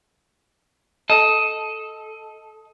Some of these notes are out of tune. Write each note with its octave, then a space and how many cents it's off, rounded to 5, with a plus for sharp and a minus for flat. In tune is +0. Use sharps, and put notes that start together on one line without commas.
A4 -10 D#5 +15